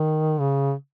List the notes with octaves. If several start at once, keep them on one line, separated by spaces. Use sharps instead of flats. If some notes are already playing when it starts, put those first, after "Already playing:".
Already playing: D#3
C#3